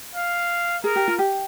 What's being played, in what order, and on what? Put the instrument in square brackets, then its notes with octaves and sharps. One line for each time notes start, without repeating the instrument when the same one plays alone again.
[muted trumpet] F5
[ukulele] G#4 [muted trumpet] A#4
[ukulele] G4
F4
G4